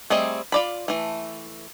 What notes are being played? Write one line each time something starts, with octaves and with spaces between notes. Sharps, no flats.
G3 A3 C4 G#4 D#5
F4 D5 B5
E3 A3